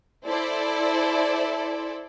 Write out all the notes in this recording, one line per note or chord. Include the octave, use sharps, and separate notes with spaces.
E4 A4 C5 D5